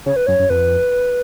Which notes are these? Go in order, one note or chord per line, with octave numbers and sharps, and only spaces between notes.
C#3 C#5
B4
F#2 C#5
F#2
F2 B4